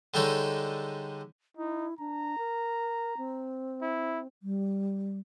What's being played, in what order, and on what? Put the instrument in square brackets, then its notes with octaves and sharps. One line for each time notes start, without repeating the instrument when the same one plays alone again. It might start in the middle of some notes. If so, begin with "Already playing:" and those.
[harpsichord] D3 G3 G#3 D#4 A4 C#5
[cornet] D#4 [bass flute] E4
[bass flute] D4 [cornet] A#5
[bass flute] A#4
C4
[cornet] E4
[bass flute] G3